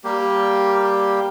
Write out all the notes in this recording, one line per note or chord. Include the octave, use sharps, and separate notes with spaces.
G3 A#3 G4